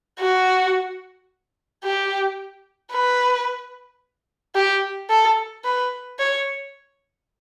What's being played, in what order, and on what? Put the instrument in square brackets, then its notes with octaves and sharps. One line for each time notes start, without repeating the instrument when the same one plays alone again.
[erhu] F#4
G4
B4
G4
A4
B4
C#5